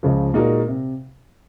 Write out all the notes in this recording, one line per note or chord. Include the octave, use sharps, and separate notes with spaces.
C#2 C#3 F3
A#2 G#3 D#4 F#4 A#4
C3